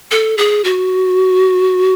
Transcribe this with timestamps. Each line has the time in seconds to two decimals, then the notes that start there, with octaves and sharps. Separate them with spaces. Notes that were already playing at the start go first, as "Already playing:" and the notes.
0.11 A4
0.38 G#4
0.64 F#4